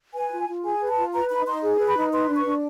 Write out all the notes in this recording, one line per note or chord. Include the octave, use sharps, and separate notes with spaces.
B4 G#5
F4
F4
G#4 G#5
B4
A5
F4
B4 A#5
D#4 B5
D#4 C6
G#4
B4
B5
D#4
B4 C6
D4
C#6
D4